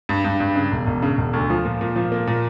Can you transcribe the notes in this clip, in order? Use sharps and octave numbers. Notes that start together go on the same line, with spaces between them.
G2
G2
G2
C#3
E1
E1
C#3
E1
D2
F3
A#2
A#2
F3
A#3
A#2